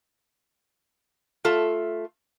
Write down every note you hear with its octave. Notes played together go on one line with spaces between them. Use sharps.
A3 F4 A4 A5